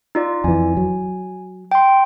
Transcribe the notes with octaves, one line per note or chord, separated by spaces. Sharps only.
D#4 F4 D5
F2 E3 G#5
F#3
G5 C6